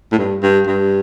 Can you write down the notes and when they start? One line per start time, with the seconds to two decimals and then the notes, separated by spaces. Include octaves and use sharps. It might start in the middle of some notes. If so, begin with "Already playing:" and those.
0.12 A2
0.18 G2
0.42 G2
0.67 G2